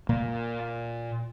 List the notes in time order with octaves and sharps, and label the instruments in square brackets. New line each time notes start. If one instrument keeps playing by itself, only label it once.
[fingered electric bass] A#2 A#3